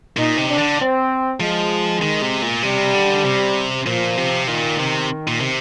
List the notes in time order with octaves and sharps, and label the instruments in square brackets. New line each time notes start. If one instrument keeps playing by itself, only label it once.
[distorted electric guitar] A#2 [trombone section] D#4
[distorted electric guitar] C3
[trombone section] D4
[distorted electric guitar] D3
[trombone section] C4
[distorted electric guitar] F3 [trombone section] G#3
[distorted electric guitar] D#3
C3
A#2
[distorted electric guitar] C3 [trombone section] G3
[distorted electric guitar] D3
C3
[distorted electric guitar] A#2 [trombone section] F3
[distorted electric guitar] C3
[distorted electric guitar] A#2 [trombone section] D#3
[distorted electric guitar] C3
A#2
C3